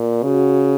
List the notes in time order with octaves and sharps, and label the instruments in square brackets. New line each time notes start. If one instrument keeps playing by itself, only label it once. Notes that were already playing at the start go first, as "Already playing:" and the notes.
Already playing: [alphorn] A#2
[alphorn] C#3 [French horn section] F#4